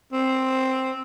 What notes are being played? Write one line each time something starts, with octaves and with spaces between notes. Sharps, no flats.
C4